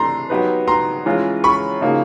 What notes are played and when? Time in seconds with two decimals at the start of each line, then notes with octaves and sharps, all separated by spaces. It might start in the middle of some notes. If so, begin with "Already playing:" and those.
Already playing: C3 E3 A3 D4 A#5 C6
0.30 F#3 B3 D#4 G4 B4
0.68 A#5 C6
1.06 E3 G#3 C#4 F4
1.44 B5 C#6
1.81 C#3 F3 A#3 D#4 F#4